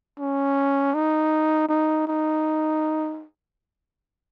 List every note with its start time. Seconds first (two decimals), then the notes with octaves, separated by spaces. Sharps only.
0.19 C#4
0.94 D#4
1.69 D#4
2.07 D#4